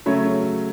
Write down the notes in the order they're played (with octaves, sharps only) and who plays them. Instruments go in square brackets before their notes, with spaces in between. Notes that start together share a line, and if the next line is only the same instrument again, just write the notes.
[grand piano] C#3 F#3 A3 C#5 E5